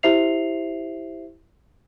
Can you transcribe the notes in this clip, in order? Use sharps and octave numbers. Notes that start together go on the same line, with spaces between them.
E4 G4 C5 E5 C7 F7